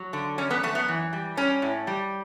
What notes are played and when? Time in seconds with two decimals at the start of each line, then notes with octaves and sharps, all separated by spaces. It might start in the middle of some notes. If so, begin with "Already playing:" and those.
Already playing: F#3
0.13 D3
0.38 F#2 C#4
0.51 B3
0.63 F#2 A3
0.75 B3
0.88 E3
1.13 G3
1.37 G3 C#4
1.62 A2
1.87 G3